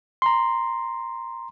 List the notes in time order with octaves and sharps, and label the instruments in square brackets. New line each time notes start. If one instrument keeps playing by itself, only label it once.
[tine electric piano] A#5 C6